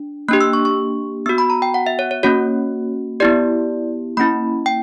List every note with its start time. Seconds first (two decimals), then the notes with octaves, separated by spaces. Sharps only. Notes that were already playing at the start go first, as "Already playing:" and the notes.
Already playing: D4
0.29 A#3 D4 G4 F#6
0.41 E6
0.53 C#6
0.65 C#6
1.26 B3 F#4 E6
1.38 B5
1.50 A#5
1.62 G5
1.74 F#5
1.86 E5
1.99 C#5
2.11 C#5
2.23 A#3 C#4 F#4 C#5
3.20 B3 E4 G4 D5
4.17 A#3 C#4 E4 B5
4.66 G5